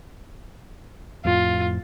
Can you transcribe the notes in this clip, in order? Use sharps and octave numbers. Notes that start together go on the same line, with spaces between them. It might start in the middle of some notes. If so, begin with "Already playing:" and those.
F2 A2 F4